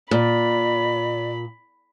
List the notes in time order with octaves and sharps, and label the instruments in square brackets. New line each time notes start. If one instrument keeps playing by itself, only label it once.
[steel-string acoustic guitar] A#2 [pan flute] D5 [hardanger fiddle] B5